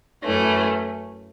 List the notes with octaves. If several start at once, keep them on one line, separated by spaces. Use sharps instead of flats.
F#2 E3 A3 C#4